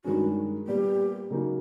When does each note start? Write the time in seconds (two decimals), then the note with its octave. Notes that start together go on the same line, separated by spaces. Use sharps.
0.04 G2 D#3 G#3 C#4 F#4
0.67 A#2 G3 B3 G4
1.30 C#3 F#3 A#3 D#4